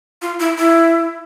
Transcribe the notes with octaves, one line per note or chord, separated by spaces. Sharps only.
F4
E4
E4